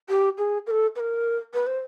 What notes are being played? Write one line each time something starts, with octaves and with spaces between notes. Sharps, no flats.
G4
G#4
A#4
A4
B4
A#4
B4
C5